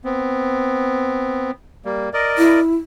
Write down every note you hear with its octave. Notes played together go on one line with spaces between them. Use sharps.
B3 C4
G3 A#3
A#4 D5 D#5
E4